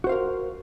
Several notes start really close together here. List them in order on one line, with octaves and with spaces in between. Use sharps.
F#4 C5 F5 A#4